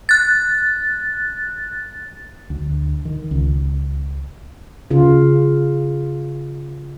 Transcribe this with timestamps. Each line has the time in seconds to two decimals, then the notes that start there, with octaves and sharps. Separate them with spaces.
0.09 F#6 A6
2.50 D2
3.05 D#3
3.31 C#2
4.91 C#3 F4